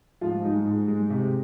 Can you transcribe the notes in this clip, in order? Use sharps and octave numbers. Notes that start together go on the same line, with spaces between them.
G#2 F3 F4
G#3 D#4
G#2
G#3
C3